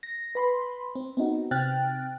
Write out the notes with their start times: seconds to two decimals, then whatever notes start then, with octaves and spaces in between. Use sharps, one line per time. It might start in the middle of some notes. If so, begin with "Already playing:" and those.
0.03 A#6
0.35 B4 B5 C6
0.95 C4
1.17 B3 C4 D#4 F#4
1.51 C3 C4 G5 F6 F#6 A6